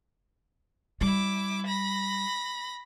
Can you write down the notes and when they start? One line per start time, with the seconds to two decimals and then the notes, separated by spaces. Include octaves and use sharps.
1.01 G3 E4 D6
1.66 B5 A#6